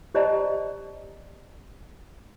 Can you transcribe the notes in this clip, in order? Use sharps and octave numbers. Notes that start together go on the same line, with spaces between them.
G4 C5 D5 D#5 A5 A#5